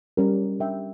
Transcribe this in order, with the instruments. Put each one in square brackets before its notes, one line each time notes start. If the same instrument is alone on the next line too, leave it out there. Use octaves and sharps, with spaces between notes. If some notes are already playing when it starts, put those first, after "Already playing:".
[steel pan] G3 C#4 G4 A#4
D4 A#4 E5 G5